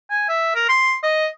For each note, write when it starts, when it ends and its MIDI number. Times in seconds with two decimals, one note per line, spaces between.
0.10 0.24 80
0.28 0.53 76
0.55 0.67 70
0.69 0.97 84
1.03 1.27 75